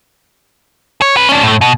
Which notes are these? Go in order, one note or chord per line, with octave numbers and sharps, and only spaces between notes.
C#5
C#4 B4
C#4 D4
A2 A3
B2